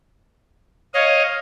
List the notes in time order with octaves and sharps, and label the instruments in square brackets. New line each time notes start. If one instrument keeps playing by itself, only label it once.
[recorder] C#5 [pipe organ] D#5 F5